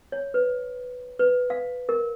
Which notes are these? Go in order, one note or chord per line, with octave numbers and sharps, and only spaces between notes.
C#5
B4
B4
F5
A#4